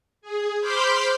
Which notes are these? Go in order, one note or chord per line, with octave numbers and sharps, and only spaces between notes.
G#4
C5 B5 C6 D6 F6 G6